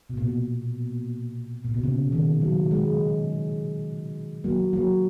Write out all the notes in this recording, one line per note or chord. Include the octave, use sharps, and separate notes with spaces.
B2
A#2
B2
A#2
B2
C#3
D#3
F#3
G#3
F#3 A#3
F#3 A#3